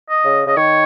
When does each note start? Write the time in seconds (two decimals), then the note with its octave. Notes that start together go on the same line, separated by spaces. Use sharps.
0.10 D#5
0.25 C#3
0.46 C#3 D#5
0.56 D#3 C#5